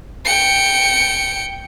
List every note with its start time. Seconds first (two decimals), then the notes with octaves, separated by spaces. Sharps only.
0.25 G5 C#7